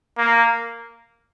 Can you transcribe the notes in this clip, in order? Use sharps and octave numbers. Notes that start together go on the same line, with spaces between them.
A#3